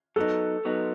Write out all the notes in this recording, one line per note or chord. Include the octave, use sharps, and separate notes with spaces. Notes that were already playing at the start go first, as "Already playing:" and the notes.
F#3 B3 D#4 A4
F#3 B3 D#4